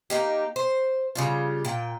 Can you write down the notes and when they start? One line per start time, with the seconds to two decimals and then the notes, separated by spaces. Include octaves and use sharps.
0.10 A#3 D#4 G4
0.56 C5
1.15 C#3 G3 F4
1.65 A#2 G5